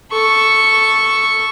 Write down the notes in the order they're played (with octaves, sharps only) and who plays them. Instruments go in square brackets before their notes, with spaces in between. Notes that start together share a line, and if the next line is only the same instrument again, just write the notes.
[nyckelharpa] A4 C#6